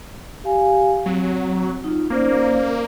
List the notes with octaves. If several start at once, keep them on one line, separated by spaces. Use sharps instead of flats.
G4 F5 G#5
F#3 C4
D#4 F4
A#3 C#4 C5 D5